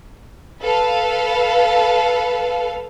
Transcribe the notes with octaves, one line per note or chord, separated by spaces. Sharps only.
A4 B4 F5